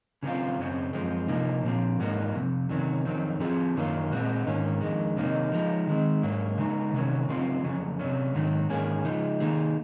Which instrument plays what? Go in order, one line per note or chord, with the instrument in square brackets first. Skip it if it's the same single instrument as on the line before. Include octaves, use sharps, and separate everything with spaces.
[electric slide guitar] C#3 F#3 C4 F4
F#2 C#3 F#3 C4
F#2 F3 G#3 C4
C3 F3 A#3 D#4
A#2 F3 C4
G#2 F#3 A#3 D#4 F#4
F2 C3
C3 D#3 F#3 C#4
F2 D#3 F#3 C4
F3 C4 F4 G#4
F#2 D#3 F#3 A#3 F4
A#2 G#3 C4 F#4
G#2 D#3 A#3 C#4
F2 D#3 G#3
C3 D#3 F#3 A#3 D#4
F3 G#3 D#4
D#3 G#3 C4
G#2 F#3 A#3
C#3 G#3 D#4 F#4
C3 D#3 F#3 C#4
C#3 F#3 C4 F4
F2 C#3 F#3
C3 F#3 C#4
G#2 D#3 F#3
G#2 D#3 A#3 C#4 G#4
C#3 F3 G#3 D#4
D#3 A#3 D#4 G#4